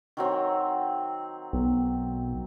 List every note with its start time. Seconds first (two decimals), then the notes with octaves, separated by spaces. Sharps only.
0.17 D#3 F#3 C4
1.53 B1